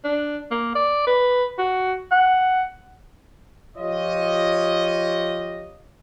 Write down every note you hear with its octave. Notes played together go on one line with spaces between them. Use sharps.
D4
A#3
D5
B4
F#4
F#5
F3 F4 G4 C#5 D#5